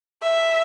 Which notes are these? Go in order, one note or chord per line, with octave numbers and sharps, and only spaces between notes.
E5